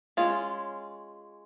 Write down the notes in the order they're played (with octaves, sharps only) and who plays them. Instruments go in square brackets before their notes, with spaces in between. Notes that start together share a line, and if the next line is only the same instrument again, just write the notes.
[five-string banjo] G#3 C#4 F4